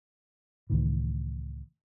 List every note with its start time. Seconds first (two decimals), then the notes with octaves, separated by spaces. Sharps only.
0.70 C#2 A2 D#3 E3